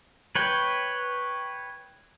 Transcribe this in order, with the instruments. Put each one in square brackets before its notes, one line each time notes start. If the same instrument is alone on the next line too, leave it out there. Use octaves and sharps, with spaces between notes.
[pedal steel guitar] B4 C#5 G5